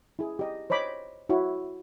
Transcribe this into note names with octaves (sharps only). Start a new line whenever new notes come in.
E4 G#4
G4 D#5
C5 C#5 D#5 B5 D6
E4 F#4 C#5